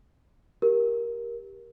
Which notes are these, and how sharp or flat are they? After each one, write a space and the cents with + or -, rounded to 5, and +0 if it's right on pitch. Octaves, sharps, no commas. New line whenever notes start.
G4 +0 A#4 +15